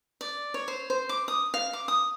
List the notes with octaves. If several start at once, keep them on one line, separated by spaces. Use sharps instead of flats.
D5
C#5
C5
C5
D6
D#6
F5
D6
D#6